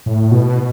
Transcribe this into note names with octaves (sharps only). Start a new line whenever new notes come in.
A2
B2